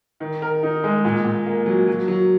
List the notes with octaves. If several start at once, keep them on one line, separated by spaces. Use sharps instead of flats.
D#3
A#4
D#4
G#3
A#2
A#2
A#3
F#3
F#3
F#3